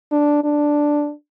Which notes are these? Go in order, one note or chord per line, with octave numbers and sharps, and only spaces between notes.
D4
D4